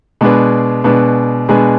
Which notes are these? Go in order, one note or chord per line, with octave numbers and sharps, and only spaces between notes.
B2 G#3 D4 G#4 B4
B2 G#3 D4 G#4 B4
B2 G#3 D4 G#4 B4